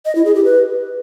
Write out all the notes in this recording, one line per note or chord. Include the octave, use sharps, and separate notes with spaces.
D#5
E4
G#4
G4
B4